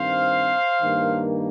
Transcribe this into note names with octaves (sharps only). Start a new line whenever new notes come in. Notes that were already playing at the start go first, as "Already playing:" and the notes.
Already playing: G2 D#3 C4 C5 F5
G2 D#3 A#3